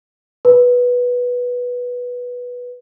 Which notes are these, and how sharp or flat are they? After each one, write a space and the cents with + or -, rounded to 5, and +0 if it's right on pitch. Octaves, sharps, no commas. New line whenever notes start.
B4 -10